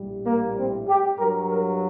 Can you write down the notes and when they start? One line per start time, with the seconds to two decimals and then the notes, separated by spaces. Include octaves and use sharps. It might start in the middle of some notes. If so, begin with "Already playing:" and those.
Already playing: A#1 A2 G3
0.26 A#3
0.57 C4
0.88 G4
1.18 G2 F#3 A#4
1.50 A#4